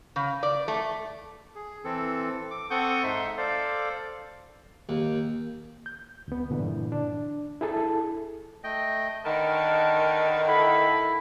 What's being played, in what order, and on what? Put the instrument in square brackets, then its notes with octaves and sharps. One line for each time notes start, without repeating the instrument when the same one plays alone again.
[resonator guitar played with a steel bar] C#3
D5
A3
[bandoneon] G#4
E3 C4 A4
D6
C4 A4 F#5 C#6 D#6 G6
G#2 D#4 E5 C6
A4 C5 D5 F5
[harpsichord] D#2
[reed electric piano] G6
D2 B3
G2 A#2 D3 E3
D4
E4 G#4 A4 A5
[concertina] A3 D#5 G5
[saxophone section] D3 D#3 [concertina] A#4 B4 A5
[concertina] E4 [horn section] A4 B5